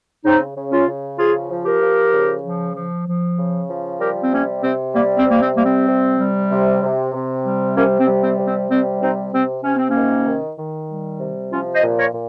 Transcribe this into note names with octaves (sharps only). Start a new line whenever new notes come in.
C#3 C4 D#4
C#3
C#4 F4
C#3
F3 F4 G#4
F3
G4 A#4
F3
C#3
F3
F3
F3
C#3
F3
G3 G4 A#4
C4
C3 A#3 C#4
C3 C4
G3 A#3
C4
C3 A#3
C4
G3 A#3
C4
C3
G3
C3
C3
C3
G3
C3 A#3 C#4
C4
G3
C4
C3
C4
G3 C4
C3 C4 D#4
C3 C4
C3 C#4
C4
A#3 C#4
D#3
D#3
D#3
G3
C3
F3 C#4 F4
C5 D#5
A#2
A#4 C#5
A#2